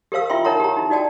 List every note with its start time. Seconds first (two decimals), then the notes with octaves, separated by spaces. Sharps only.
0.12 G4 A#4 C5 F5 E6
0.30 E4 F4 E5 G5 C6
0.44 D#4 A#4 C#5 F#5 A#5 C6
0.60 G4 A#5
0.77 D#4 E4
0.90 D#4 F#4 D5 G5 A5